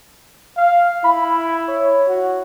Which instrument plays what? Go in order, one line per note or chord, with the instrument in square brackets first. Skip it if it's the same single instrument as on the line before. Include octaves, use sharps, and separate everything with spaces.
[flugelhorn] F5
[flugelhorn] E4 [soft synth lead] B5
[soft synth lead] C#5
[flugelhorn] F#4